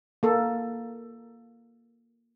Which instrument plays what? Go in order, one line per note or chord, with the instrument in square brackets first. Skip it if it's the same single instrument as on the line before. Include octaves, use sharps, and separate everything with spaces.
[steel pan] A#3 A4